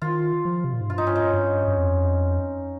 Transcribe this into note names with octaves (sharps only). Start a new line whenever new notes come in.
D#3 F4
F3
C3
A#2
G#2
G2 F4
D#4
C#4
D#4
G2
G2
F2